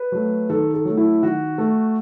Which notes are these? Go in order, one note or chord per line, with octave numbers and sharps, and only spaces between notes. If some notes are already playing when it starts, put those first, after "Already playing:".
Already playing: B4
F#3 A3
D#3 A4
A4
F#3 A3
E4
D#3 F#4
A3